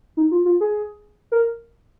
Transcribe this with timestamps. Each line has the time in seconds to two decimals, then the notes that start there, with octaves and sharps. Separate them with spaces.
0.17 D#4
0.31 F4
0.45 F4
0.61 G#4
1.32 A#4